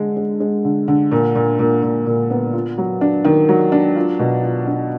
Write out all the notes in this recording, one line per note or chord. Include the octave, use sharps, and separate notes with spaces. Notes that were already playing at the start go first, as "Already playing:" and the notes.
Already playing: D3 G#3
G#3
G#3
D3
D3
A#2
A#2
A#2
A#2
A#2
B3
F4
F#3
D4
D#3
F#3
D4
F4
B2
F4
D4